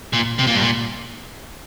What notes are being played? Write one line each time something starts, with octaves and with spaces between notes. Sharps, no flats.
A#2
C3
A#2
G2
A#2